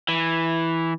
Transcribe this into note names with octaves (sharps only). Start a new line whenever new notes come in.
E3